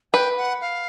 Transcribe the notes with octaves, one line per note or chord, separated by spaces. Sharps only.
B4 G5
F#5
F5